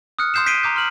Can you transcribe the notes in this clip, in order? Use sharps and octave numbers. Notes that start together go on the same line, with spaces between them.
D#6 F6 F#6 C#7
C6 D#6 G6 C7 E7
G6 B6 C7 D7 D#7 G7
A#5 D6 G6
C6 F6 F#7